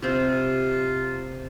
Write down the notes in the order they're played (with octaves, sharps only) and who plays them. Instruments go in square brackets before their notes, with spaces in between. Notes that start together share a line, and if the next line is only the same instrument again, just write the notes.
[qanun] C3 C4 G4 [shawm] F4